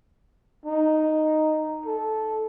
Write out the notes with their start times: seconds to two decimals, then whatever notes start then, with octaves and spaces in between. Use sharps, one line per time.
0.66 D#4
1.86 A4